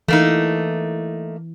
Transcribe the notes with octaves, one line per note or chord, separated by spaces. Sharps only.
E3 A3 A#3 D#4